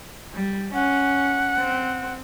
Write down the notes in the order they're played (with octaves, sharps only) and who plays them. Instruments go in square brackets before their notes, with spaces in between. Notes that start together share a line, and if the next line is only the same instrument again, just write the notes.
[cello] G3
[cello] C#4 [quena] F#5
[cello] C4